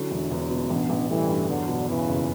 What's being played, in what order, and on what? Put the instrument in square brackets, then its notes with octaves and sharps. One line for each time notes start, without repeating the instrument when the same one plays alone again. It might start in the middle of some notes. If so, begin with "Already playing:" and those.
Already playing: [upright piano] D3 F#3 [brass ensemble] C#4 E4
[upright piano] E1
E2
B2
[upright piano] A1 [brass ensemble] B3 D4
[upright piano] A1
[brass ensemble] E3 G3 [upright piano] A3
[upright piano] G2
[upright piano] E2 [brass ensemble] D3 F#3
[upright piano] B2
[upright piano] E2 [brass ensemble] C#3 E3
[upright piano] F#1